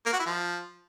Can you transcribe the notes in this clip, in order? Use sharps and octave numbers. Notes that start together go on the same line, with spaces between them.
A#3
F#4
E4
F3